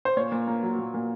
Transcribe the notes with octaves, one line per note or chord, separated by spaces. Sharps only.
C5
A#2 C#5
A#2
A#3
F#3
A#2
A#2